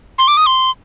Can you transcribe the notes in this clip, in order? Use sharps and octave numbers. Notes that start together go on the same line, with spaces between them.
C6
D6
D#6
C6